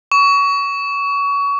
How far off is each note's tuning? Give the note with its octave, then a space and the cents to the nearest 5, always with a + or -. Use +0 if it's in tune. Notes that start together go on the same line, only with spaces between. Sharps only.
C#6 +25